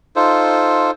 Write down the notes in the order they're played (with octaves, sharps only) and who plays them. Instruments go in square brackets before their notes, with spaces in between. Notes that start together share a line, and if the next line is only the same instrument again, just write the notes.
[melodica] D#4 F4 A4 C5